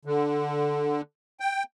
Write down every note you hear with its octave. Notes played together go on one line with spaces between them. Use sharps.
D3
G5